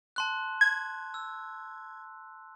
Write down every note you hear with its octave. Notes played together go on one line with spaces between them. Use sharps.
A5 C6 F#6
G#6
E6